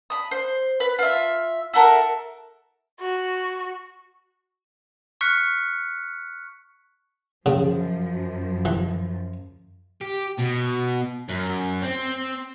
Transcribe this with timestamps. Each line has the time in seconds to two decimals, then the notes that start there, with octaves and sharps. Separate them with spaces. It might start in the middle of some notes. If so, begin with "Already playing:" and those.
0.10 B5 D#6
0.31 C5
0.80 B4
0.99 F4 E5
1.73 E4 F#4 A4 A#4
3.00 F#4
5.21 C#6 F6 F#6 B6 C#7
7.46 F#2 C#3 F3
8.65 E3
10.01 G4
10.39 B2
11.29 F#2
11.83 C4